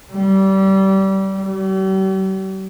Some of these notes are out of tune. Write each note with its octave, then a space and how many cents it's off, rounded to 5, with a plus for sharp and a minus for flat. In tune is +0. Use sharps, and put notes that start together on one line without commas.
G3 -25
G3 -45